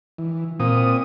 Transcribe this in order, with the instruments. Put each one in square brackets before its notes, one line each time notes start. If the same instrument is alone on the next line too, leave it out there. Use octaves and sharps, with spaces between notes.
[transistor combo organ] E3
[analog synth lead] A#2 [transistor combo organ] C4 D#6